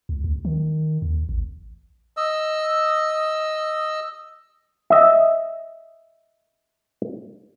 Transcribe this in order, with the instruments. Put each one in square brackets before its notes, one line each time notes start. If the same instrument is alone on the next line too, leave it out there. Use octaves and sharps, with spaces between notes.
[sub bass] C#2
D2
D#3
D#2
A1
[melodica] D#5 E6
[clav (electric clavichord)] D#5 E5